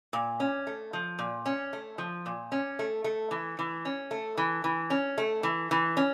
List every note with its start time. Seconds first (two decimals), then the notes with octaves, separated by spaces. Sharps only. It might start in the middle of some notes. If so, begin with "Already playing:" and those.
0.13 A#2
0.40 C#4
0.67 A3
0.93 F3
1.19 A#2
1.46 C#4
1.73 A3
1.98 F3
2.26 A#2
2.52 C#4
2.79 A3
3.04 A3
3.31 E3
3.59 E3
3.85 C#4
4.11 A3
4.37 E3
4.64 E3
4.90 C#4
5.18 A3
5.43 E3
5.71 E3
5.97 C#4